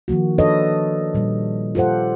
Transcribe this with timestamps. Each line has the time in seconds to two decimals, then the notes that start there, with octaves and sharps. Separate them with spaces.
0.08 D#3 F3 A#3 F#4
0.38 D4 A4 B4 C#5 D#5
1.14 A#2 G3
1.75 F4 G4 A4 C5 F#5